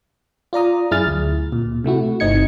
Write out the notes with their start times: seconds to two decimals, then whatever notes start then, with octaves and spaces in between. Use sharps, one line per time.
0.53 F4 D5 A#5 D#6
0.91 F#2 E4 G#4 F6 A6
1.07 D2
1.52 A#2
1.84 C3 A3 E4 F#4
2.20 G1 C4 D#4 D#5 G#6 C#7